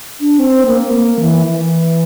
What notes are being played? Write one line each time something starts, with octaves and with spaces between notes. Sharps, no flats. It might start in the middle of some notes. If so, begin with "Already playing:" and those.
D4
C4
A#3
A#3
E3
E3